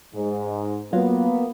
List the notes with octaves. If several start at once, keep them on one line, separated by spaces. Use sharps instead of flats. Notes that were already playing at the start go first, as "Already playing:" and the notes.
G#2
F#3 A#3 B3 F4